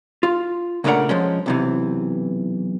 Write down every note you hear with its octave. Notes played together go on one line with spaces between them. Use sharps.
F4
A#2 C#3 A3 D4 A#4 F#5
F3 G#3 C#4
B1 C3 E3